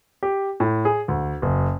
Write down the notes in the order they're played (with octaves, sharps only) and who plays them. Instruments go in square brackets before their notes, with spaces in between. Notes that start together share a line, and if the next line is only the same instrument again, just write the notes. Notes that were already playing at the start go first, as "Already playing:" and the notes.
[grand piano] G4
A2
G#4
D2
F#1